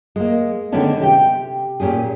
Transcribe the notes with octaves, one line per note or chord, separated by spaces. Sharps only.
G#3 A#3
D3 D#3 G#3 B3 C#4 D4
C3 G4 G5
A#2 C#4 G4 G#4